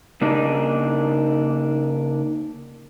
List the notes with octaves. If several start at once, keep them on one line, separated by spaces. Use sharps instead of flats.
C#3 A#3 D4 D#4